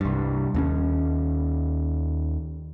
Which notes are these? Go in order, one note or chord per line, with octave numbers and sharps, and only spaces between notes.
C2 G2
D#2 C4 C#4